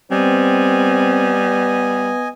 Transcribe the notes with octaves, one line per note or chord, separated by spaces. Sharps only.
G3 B3 C4 D#5 G#5